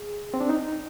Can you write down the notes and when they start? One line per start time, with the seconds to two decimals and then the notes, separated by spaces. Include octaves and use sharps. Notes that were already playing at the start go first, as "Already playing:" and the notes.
Already playing: G#4
0.34 C4
0.41 D4
0.49 D#4